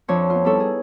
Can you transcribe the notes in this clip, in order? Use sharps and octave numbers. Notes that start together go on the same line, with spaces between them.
F2 F3 D4 C#5 C#6
B3 F4
G3 B3 D#4 E4 A4 C#5
G#4